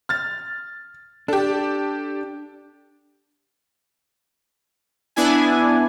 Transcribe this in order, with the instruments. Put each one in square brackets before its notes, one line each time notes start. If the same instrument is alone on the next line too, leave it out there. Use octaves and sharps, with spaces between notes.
[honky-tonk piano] F6 A6
[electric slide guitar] D4 [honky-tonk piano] G4 A4
[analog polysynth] B3 D4 E4 G#5